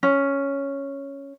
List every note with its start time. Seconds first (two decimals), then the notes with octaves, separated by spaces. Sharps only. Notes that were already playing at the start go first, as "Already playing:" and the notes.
0.03 C#4